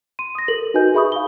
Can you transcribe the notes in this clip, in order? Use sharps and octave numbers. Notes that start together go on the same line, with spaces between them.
C6 D#7
D#6 A#6
A4 A#4 F#7
D#4 F#4 B4 D#5 G#5 G6
G#4 E5 B5 C#6 D#6
F5 G7